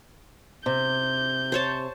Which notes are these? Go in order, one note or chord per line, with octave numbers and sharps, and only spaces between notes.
C3 G6
C5 C#5 A5